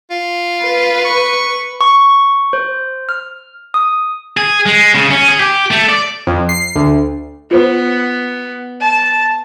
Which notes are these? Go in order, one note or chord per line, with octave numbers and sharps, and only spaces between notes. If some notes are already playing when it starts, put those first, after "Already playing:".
F4
B4
C#6
C#6
C5
F6
D#6
G#4
G#3
C#3
C#4
G#4
G4
A3
D5
F2
C7
D2
B3 F4 B4 C5
A5